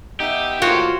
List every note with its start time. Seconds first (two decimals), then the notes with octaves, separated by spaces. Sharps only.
0.20 B3 D#4 G4 E5
0.62 A2 D#3 A#3 F4 F#4 C5 C#5